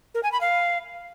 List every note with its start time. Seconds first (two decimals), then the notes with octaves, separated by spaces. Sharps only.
0.14 A#4
0.23 G#5
0.32 B5
0.41 F5